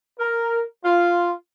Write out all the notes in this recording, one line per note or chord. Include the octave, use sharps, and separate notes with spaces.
A#4
F4